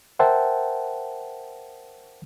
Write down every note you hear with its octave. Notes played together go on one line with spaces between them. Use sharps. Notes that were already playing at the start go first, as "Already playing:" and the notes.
A#4 C5 E5 F#5 G5 A5